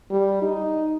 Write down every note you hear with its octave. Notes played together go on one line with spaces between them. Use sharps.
G3
D#4